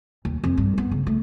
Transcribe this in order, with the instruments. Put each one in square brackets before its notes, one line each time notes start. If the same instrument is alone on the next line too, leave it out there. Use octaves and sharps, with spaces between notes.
[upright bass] D#2
F2
G2
B3
C#3
A3